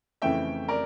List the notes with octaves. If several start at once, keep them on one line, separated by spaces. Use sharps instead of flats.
F2 C#3 E3 A3 C#4 E5 G5
A#4 D5